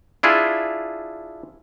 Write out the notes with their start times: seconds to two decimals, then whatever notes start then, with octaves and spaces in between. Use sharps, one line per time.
0.23 D4 E4 F4 G#4